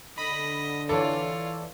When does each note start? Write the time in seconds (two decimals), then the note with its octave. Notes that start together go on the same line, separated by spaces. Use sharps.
0.18 D3 D#5 B5
0.89 E3 F4 A4 C#5 D5